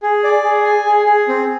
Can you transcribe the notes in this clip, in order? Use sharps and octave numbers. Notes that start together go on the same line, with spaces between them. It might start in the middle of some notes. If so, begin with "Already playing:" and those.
G#4
D5
G#4
G#5
G#4
G#4
C4